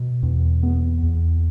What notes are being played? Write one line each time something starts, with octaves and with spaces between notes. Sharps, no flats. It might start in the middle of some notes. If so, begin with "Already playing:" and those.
Already playing: B2
E2
B3
E2